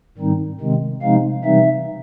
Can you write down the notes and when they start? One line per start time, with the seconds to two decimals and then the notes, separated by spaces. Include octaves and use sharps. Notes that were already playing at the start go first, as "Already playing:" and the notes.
0.17 G#2 D#3 G3 C4 D#4
0.60 C3 D#3 G#3 C4
1.02 C3 F3 G#3 C4 D#4 F5
1.44 C3 E3 G3 C4 D#4 E5